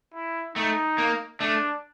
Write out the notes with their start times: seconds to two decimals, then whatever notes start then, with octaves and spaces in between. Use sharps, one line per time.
0.14 E4
0.55 A3 D#4
0.98 A#3
1.40 A3 D4